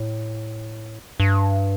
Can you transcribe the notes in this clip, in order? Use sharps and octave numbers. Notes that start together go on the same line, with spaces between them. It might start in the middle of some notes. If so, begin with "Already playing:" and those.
Already playing: A2
G2